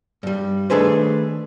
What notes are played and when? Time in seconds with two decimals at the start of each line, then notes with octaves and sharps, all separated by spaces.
0.23 G2 G3
0.70 D#3 A3 D4 G#4 B4 C5